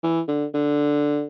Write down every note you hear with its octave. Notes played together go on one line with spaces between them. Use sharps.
E3
D3
D3